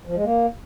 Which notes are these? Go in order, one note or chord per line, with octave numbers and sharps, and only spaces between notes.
F3
G#3
A#3